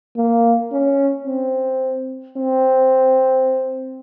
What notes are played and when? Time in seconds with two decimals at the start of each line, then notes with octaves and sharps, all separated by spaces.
0.16 A#3
0.72 C#4
1.27 C4
2.37 C4